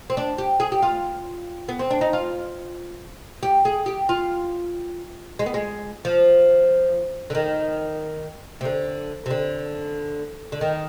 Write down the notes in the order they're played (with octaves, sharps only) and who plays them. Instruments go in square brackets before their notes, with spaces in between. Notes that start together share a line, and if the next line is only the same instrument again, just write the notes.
[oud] C4
D4
G4
G#4
G4
F4
B3
C4
D4
D#4
F4
G4
G#4
G4
F4
G#3
B3
G#3
F3
D3
D#3
C3
D3
C3
D3
D3
D#3